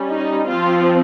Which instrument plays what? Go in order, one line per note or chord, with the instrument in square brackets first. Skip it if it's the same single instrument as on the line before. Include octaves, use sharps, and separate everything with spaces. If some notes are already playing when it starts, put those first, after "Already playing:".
Already playing: [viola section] G3 C#4
D#4
F3 C4 F4